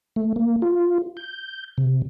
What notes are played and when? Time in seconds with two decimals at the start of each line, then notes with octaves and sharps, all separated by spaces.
0.16 A3
0.36 A#3
0.62 F4
1.17 G6
1.78 C3